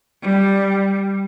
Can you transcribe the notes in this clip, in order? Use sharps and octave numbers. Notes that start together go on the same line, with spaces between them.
G3